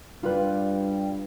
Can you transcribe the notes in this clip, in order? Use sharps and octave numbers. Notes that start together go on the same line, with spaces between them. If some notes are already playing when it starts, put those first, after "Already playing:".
G2 G3 F4 B4